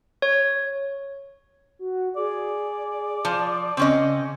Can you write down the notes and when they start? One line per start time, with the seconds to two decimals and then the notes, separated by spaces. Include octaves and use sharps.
0.22 C#5
1.79 F#4
2.16 G#4 D5
3.25 F3
3.77 C#3 C4 C#4 D#5